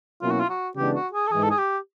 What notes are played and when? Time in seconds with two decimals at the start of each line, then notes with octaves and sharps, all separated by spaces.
0.22 B2 F#3 A#3 C#4 E4 F4
0.31 F#4
0.40 F4
0.50 F#4
0.76 C#3 E3 G#3 B3 D4 G4
0.95 F#4
1.13 G#4
1.27 A4
1.31 G#2 E3 G#3 G#4
1.43 A4
1.51 G#4
1.59 G4